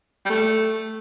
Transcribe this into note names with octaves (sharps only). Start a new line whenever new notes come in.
G3
A3